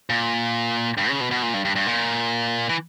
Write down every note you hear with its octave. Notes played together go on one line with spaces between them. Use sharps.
A#2
G2
C#3
B2
B2
A#2
G2
G2
G2
A#2
E3